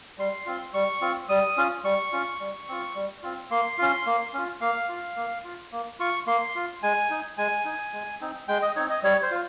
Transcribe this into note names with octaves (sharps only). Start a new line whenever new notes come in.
G3 C6
C4 F4
G3 C#6
C4 F4
G3 D#6
C#4 F4
G3 C#6
C#4 F4
G3
C4 F4
G3
C4 F4
A#3 C6
C#4 F4
A#3
C#4 F4
A#3 F5
F4
A#3
F4
A#3
F4 C#6
A#3 C6
F4
G#3 G#5
D#4
G#3 G#5
D#4
G#3
C4 D#4
G#3 G5
D#5
C4 D#4 C#5
D#5
G3 C#5
C5
F4